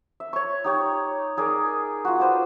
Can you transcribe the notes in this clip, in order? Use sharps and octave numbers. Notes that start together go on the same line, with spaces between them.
E5
C#5 C#6
D#4 G4 C#5
D#4 G#4 A#4 D5
F4 F#4
B4 C5 D5